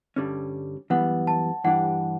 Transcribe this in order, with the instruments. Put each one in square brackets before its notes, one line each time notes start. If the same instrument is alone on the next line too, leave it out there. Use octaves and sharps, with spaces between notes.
[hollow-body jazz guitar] G2 D3 G3 C#4
[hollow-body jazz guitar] F#2 E3 G3 B3 [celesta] F#5
[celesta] A5
[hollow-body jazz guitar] G2 E3 G3 D4 G4 [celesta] F#5